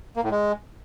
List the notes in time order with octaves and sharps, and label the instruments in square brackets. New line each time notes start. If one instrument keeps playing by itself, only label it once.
[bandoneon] A#3
A2
G#3